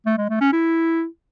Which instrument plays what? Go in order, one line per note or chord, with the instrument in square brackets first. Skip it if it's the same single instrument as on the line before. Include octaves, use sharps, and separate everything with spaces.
[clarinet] A3
G#3
A3
C#4
E4